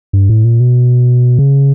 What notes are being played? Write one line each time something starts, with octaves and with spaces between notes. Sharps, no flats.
G2
A2
A#2
B2
C#3